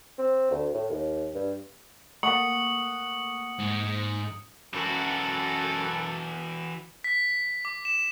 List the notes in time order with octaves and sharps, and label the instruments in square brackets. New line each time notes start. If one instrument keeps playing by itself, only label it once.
[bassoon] C4
D2
A2
D#2
G2
[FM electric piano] A3 A#3 [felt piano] F#5 C#6 [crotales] D#6 C#7 F#7
[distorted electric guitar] G#2
[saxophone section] F#2 [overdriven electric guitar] E3 F#4 [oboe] A4
[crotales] B6
D6
E7